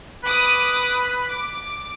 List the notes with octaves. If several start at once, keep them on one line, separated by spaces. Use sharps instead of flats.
B4 B5 D6 D#6
D6